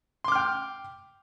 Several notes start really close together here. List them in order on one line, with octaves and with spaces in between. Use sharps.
C6 D6 F6 G5